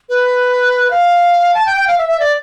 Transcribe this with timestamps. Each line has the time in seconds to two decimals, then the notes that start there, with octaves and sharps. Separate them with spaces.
0.09 B4
0.91 F5
1.54 A5
1.66 G5
1.77 G5
1.87 F5
1.98 E5
2.09 E5
2.20 D5